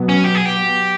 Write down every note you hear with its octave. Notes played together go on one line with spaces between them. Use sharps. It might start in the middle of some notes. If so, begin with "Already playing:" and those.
Already playing: B2 F#3 B3
C#4
G4
G#4
G4